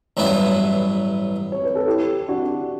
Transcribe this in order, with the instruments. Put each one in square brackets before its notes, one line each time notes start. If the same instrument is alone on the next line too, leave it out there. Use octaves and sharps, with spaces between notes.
[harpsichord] A1 G2 F#3 B3 E4
[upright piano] C#5
B4
A4
E4 G4
D4 F#4